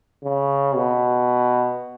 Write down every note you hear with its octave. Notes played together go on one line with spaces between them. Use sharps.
C#3
B2